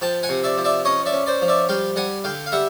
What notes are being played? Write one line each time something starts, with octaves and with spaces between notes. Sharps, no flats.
F3 G5 A5
F#5 G#5
C3
D5 E5
F3
D5 E5
C#4 C#5 D#5
D5 E5
C#4
C5 D5
F3
D5 E5
G3 F5 G5
G3 F#5 G#5
D3 F5 G5
F5
G3 E5 F#5